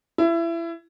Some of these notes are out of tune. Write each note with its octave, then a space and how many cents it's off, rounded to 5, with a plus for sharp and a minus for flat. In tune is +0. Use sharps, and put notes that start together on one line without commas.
E4 +25